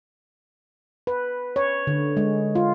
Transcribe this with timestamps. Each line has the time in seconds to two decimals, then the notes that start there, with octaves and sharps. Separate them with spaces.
1.07 B4
1.56 C#5
1.87 D3
2.17 G#3
2.55 F4